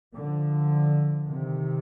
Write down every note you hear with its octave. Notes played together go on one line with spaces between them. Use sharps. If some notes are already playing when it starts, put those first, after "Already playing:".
D3 F3
C3 D#3